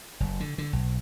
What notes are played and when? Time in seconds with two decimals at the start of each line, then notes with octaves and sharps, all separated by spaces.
0.20 F#1
0.40 D3
0.58 D3
0.73 B1